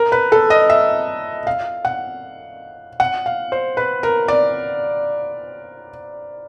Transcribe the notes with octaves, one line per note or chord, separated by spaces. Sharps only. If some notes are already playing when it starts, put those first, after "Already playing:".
Already playing: A#4
B4
A4
D#5
E5
F5
F#5
F#5
F5
C5
B4
A#4
D5